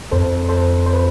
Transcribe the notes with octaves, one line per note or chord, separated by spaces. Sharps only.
F2 A4 C5
A4 C5
C5
B4